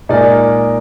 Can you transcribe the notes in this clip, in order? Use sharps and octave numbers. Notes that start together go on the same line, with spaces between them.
A#2 G#3 D#4 A#4 D5